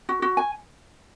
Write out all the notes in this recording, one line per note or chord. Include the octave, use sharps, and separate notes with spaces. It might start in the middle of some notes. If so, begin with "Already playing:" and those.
F#4
F#4
G#5